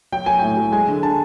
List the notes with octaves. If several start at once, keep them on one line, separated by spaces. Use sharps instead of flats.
F#3 G5
F#3 G#5
A2 G5
F#3
G#3 G#5
D3
D3 A5